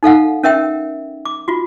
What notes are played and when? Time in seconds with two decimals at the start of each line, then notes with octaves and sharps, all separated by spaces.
0.03 D#4 A4 F5 F#5
0.43 C#4 A#4 E5 G5
1.25 D6
1.48 F4 F#4